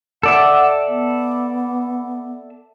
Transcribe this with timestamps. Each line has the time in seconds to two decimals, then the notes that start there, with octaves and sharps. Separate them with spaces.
0.23 A4 D5 E5 F#5
0.88 B3